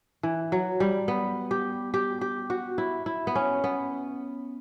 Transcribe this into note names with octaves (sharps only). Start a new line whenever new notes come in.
E3
F#3
G3
B3
G4
G4
G4
F#4
E4
E4
B3
C#4
B3